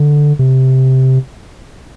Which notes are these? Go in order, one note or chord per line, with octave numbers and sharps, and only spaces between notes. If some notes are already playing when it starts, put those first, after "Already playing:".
Already playing: D3
C3